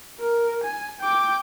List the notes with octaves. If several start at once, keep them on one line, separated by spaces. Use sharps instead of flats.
A#4
G#5
G5 D6